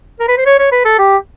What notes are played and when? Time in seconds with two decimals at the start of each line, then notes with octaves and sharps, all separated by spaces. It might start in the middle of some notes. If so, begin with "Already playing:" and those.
0.20 A#4
0.28 B4
0.38 C5
0.46 C#5
0.59 C#5
0.72 B4
0.85 A4
0.99 G4